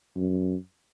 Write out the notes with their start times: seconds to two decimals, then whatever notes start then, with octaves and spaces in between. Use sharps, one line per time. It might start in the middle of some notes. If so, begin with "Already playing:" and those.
0.16 F#2